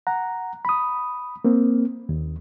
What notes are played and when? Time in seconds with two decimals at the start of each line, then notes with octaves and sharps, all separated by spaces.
0.07 F#5 A#5
0.65 B5 D#6
1.45 A#3 C4
2.09 D#2